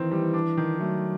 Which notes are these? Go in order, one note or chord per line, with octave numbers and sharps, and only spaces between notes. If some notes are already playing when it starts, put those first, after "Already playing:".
Already playing: D#3 E3 C4
G3
D4
D#3
F#3 A3